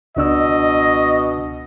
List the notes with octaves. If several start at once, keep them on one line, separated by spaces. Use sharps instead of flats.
C#2 B2 D4 D#5 E6